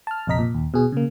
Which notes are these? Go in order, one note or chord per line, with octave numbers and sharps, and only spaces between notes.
A5 F6
A#1 F2 C3 D#5 A#5 B6
A#2
D#2
B2 G#4
C#3 A#3